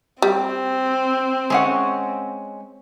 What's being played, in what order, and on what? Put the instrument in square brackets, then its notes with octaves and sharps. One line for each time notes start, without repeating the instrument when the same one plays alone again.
[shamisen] G3 [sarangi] C4
[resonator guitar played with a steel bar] G#3 C#4 F#5